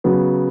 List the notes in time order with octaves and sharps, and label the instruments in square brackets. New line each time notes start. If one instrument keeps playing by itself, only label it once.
[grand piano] C#3 F#3 B3 F#4